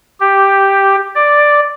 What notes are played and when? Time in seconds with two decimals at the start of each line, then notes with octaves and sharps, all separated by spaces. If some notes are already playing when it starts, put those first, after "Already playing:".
0.20 G4
1.15 D5